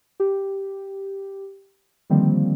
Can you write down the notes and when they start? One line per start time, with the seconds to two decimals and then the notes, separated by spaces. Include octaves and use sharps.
0.20 G4
2.10 D3 D#3 F3 G3 A#3 C4